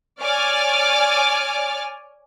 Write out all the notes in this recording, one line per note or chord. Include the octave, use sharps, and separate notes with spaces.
C#5 D5 G#5 D6 F6